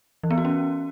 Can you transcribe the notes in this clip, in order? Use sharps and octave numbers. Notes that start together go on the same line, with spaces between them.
E3
B3
F#4
C#4